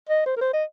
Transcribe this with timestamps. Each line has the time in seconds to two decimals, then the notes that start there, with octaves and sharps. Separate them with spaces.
0.09 D#5
0.26 C5
0.36 A#4
0.41 C5
0.53 D#5